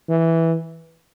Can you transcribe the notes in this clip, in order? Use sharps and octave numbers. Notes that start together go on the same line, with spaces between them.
E3